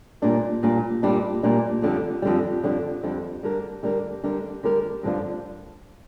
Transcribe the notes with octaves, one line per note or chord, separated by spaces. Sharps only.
A#2 G3 D4
A#2 G3 D4
A#2 G3 D4
A#2 G3 D4
F2 D3 G3
F2 D3 G3
F2 D3 G3
F2 D3 G3
D3 G3 D4 A#4
D3 G3 D4 A#4
D3 G3 D4 A#4
D3 G3 D4 A#4
G2 D3 F3 D4 F4